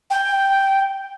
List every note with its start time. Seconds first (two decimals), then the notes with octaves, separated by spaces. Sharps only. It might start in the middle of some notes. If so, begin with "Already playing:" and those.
0.10 G5